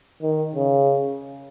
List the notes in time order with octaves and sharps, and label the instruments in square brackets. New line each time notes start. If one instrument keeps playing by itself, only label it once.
[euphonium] D#3
C#3